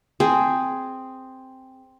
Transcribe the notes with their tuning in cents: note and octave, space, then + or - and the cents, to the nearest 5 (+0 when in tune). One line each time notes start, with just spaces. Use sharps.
C4 +0 G#4 +5